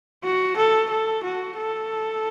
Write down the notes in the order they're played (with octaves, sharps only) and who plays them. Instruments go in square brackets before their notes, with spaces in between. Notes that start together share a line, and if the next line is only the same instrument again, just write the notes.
[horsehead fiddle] F#4
A4
A4
F#4
A4